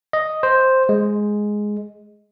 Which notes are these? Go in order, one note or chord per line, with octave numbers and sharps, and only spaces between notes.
D#5
C5
G#3